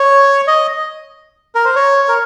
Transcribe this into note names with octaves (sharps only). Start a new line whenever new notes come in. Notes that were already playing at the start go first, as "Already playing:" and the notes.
Already playing: C#5
D#5
A#4
C5
C#5
A#4